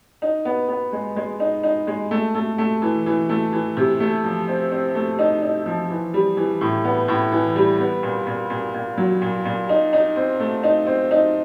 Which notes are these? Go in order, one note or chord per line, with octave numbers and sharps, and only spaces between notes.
D#4
B3
B3
G#3
G#3
D#4
D#4
G#3
A3
A3
A3
E3
E3
A3
E3
C3
A3
F3
C4
C4
A3
D#4
D#4
F3
E3
G3
E3
A2
B3
A2
E3
G3
B3
A#2
A#2
A#2
A#2
F#3
A#2
A#2
D#4
D#4
C4
A3
D#4
C4
D#4